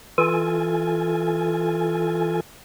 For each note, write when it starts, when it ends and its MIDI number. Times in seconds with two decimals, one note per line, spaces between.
0.18 2.41 52
0.18 2.41 65
0.18 2.41 69
0.18 2.41 80